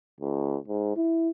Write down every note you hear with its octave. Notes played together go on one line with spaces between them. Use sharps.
C#2
G#2
E4